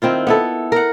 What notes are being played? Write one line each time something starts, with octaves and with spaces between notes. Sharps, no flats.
D#3 C4 E4 F4
B3 E4 A4
A#4 F#5